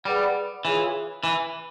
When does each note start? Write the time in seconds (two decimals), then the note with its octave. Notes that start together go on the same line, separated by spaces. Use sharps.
0.05 G3 G#4 B4 D5 F#5
0.65 E3 F4 G#4 C#5
1.24 E3